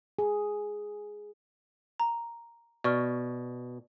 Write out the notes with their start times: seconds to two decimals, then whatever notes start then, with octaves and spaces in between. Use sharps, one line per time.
0.19 G#4
2.00 A#5
2.84 B2 D5 C#6 F6